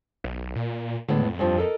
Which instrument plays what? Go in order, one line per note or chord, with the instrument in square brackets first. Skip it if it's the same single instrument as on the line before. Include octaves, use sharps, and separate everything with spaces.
[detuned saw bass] B1
A#2
[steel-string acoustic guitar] A2 G#3 B3 [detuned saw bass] D3
[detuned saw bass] F2
[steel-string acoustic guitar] G2 F3
A4 A#4 D#5